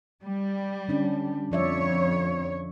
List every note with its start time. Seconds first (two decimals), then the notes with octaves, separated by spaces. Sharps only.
0.23 G3
0.88 D3 C#4 D4
1.52 F2 F3 C#5 D5 E5